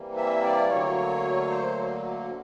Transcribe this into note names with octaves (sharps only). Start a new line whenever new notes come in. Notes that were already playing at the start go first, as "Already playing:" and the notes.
Already playing: C3 E3 G3 A#3
E5
D5
D2 D3 F#3 A#3 C#5
C5